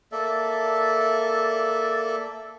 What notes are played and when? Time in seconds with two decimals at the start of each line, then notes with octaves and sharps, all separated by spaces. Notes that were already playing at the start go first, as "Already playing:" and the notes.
0.12 A#3 A4 D5 E5